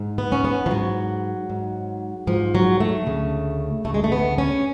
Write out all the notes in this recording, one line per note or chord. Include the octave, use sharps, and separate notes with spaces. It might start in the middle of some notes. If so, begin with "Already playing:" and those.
Already playing: G#2
B3
C#4
B3
F3
G#2 F#3
G#2
G#2 F3
F#3
A3
D2 C#3
D2 C#3 A3
G#3
A3
B3
C#4